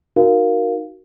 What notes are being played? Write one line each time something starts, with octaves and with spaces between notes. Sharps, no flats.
D#4 F#4 A#4 F5